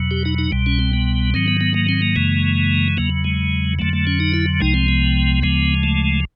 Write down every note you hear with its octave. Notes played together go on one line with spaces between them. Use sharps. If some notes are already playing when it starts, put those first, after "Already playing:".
Already playing: E2 B2 F#3
G4
D#4
D#4
C2 B2 G3
C#4
C4
B3
G#2 D#3 F#3 C4
B3
B3
A#3
C4
A#3
F#2 C#3 E3 G#3
E2 C#3 F#3 A#3
G#3
F2 D3 F#3 A3
A3
C#4
D#4
E4
C2 C3 F3 G#3 D#4
C4
B3
D2 C#3 F3 G#3
A3